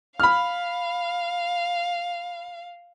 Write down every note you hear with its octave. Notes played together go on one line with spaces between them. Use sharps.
F5 B5 F6